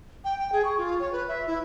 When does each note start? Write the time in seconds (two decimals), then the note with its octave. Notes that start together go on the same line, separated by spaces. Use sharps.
0.24 G5
0.39 G5
0.52 G#4
0.65 C#6
0.78 F4
1.00 C#5
1.12 B4
1.28 E5
1.47 E4